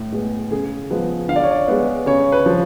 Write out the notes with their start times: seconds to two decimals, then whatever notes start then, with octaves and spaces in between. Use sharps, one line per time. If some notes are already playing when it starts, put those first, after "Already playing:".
Already playing: A2
0.12 G#3 B3
0.51 C#3 G#4
0.90 F3 G#3 B3
1.28 D3 F5
1.36 D5
1.43 C#5
1.51 D5
1.68 G#3 B3
2.06 C#3 C#5
2.32 B4
2.46 F3